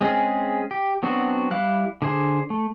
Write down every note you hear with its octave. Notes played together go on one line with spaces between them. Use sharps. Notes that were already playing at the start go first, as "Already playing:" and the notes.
G#3 C4 C#4 G#4
G4
F#3 B3 C4 D4 F#4
G3 E4 F5 F#6
D3 D4 G#4 C5
A3